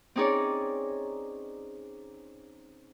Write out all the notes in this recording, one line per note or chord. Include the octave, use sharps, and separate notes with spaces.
C4 C#4 D#4 G#4 C#5 D5